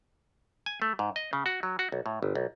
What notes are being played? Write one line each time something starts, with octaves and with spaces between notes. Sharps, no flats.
G#5
A3
G#2
D#5
C#3
F#4
F#3
F#4
B1
A2
G1
B1